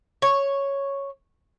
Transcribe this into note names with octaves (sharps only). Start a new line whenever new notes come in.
C#5